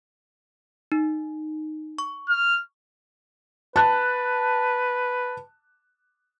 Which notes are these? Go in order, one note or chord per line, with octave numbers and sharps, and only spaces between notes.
D#4
C#6
F6
B4 A5 F#6